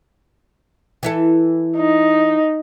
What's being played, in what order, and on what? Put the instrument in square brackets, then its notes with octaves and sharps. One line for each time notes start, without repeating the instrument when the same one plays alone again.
[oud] E3 E4 A4
[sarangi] D#4